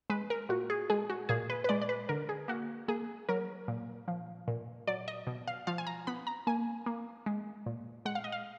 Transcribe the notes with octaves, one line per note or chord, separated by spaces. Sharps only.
G#3 B4
A#4
A#2 F#4
G#4
G#3 G#4
F#4
A#2 G#4
B4
B4
G#3 D5
D5
B4
D3 A#4
G#4
A#3 F#4
A#3 G#4
F#3 A#4
A#2
F3
A#2
F#3 D5
D#5
B2
F5
F3 F5
G#5
A#5
B3 B5
A#5
A#3 G#5
A#3
G#3
A#2
G#3 F#5
F5
D#5
F5